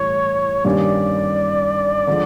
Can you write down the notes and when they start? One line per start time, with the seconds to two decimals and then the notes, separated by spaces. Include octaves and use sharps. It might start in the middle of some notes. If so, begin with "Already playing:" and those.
Already playing: A2 E3 G3 C#5
0.65 G2 D#3 G3 A#3 C#4 D5
2.07 D3 F3 G#3